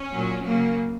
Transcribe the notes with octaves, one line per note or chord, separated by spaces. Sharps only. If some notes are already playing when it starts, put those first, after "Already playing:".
Already playing: C#4
A#2 F#3
C#3 F#3 A#3